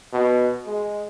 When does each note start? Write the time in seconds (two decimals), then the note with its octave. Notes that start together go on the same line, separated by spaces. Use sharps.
0.13 B2
0.67 G#3